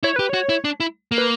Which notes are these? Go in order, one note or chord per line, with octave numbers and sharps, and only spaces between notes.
E4 C#5
G4 B4
F#4 C#5
E4
D4
E4
A#3
B4